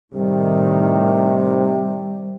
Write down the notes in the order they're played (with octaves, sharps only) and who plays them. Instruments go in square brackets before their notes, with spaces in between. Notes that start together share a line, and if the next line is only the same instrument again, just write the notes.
[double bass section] A2 D#3 [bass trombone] C3 [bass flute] G3